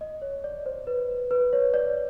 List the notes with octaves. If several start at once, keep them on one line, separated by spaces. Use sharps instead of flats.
D#5
C#5
D5
C5
B4
B4
C#5
D5